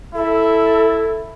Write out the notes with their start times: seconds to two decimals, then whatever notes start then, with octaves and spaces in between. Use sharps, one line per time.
0.15 E4 A4